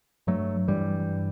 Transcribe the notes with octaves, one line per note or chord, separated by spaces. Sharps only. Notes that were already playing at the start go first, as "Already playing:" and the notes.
G2 F#3 A3
G2 E3 G3